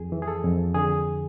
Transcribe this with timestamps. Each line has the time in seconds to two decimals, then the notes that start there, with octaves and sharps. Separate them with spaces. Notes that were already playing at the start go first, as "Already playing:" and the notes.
Already playing: F2 G#4
0.12 E3
0.22 G#4
0.28 A4
0.44 F2
0.74 D3 G#4